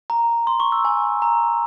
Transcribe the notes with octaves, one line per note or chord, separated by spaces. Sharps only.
A#5
C6
C#6
E6
G#5
A#5